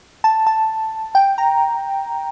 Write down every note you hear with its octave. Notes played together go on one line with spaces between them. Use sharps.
A5
A5
G5
A#5